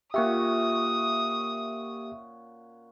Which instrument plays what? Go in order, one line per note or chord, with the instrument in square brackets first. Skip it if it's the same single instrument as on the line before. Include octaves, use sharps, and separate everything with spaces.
[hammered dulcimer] A#2 C#4 F#4 [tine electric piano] A#3 G4 [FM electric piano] E5 C#6 [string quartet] D#6